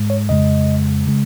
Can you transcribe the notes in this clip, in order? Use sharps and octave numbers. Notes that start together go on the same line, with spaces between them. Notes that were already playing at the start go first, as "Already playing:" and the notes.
Already playing: G#2 G#3
C#5
F2 C#3 G#3 D#5
C#3 G#3